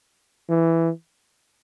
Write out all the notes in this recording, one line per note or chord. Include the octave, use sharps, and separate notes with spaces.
E3